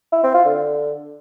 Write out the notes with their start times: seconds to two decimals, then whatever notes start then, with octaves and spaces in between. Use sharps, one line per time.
0.13 E4
0.23 C4
0.34 F4
0.45 D3